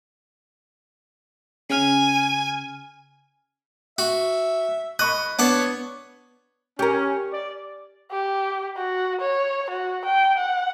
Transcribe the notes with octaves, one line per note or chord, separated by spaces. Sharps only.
C#3 G#5 F6
F#4 E5
D#5 B5 C#6 F#6
B3 D4 C#5 F#5 A5
C#4 G4 A#4
D5
G4
F#4
C#5
F#4
G5
F#5